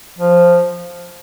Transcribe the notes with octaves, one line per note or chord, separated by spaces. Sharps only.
F3